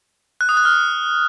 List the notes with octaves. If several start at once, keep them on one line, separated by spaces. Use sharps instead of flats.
F#6
D#6
F#6
F6